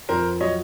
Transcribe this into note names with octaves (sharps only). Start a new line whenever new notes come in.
F2 A#4 C5
F#3 C#5 D#5